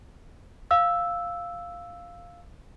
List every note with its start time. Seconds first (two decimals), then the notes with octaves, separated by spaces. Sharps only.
0.71 F5 E6